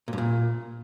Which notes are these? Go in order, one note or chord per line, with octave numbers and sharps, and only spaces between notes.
A#2
G2
A#2